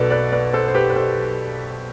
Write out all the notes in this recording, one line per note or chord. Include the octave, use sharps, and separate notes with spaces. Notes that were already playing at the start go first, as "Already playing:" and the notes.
Already playing: B1 B2 A4 B4 D5
B4 D5
B4 D5
A4 C5
C5
G4 B4
B4
A4 C5